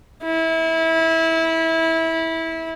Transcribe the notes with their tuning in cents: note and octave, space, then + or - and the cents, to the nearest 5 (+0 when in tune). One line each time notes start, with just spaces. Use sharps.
E4 -20